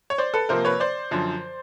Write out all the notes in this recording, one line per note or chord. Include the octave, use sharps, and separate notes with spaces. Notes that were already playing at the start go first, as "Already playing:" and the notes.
C#5
C5 D5
A4 B4
C3 F3 A#3 A#4 C5
B4 C#5
C5 D5
F#2 D3 F3